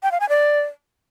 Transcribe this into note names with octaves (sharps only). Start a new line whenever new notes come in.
G5
F5
G#5
D5